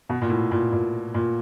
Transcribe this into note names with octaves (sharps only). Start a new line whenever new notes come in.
B2
A#2
A2
A#2
A#2
A#2